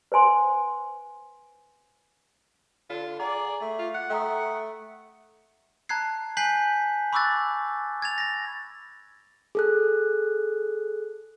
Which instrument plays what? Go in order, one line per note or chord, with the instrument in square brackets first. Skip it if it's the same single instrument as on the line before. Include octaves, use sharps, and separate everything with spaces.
[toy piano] B4 C5 G#5 C6
[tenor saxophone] D3 [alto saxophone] F4
[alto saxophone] G#4 [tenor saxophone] D5 [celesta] F#5 A#5
[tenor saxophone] A3
[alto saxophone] F4
[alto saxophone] F#5 [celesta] F#6
[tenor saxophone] A3 [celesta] G5 A#5 D#6
[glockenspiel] A5 A#5 F#6 G#6 C7
G#5 F#6 G6 B6 C7 F#7
B5 C#6 D6 E6 F#6 A6
G#6 A6 F7
A6 A#6
[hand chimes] G#4 A4 F#6